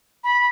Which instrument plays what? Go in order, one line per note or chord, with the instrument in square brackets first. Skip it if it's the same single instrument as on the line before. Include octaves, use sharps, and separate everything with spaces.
[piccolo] B5